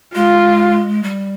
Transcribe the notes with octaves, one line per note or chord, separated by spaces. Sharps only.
G#3 F4
G3